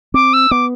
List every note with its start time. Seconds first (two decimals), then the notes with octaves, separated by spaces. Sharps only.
0.14 C4 D6
0.33 E6
0.51 B3 D6